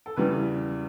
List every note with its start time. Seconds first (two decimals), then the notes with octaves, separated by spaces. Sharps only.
0.06 A4
0.16 E2 C#3 E3 G3 B4